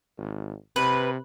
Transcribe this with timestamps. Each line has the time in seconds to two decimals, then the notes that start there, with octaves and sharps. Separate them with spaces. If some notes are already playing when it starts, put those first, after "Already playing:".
0.17 G#1
0.76 C3 B4